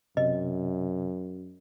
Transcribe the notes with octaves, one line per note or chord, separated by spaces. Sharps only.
F#2 C3 D#5